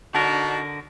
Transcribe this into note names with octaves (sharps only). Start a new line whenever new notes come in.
D3 D4 D#4 F#4 A#4